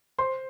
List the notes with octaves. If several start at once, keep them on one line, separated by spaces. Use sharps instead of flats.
C5 C6